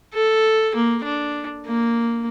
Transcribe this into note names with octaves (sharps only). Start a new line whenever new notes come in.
A4
A#3
D4
A#3